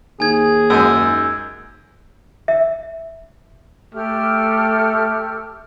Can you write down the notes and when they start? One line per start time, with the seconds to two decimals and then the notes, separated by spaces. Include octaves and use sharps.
0.20 D#2 G#4 G#5 G#6
0.70 F#2 G#3 G#5 E6
2.48 E5
3.94 A3 G4 A4 F6